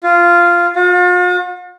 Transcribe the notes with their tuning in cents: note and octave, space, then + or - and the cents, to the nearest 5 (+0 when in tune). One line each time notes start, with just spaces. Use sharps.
F4 -10
F4 +45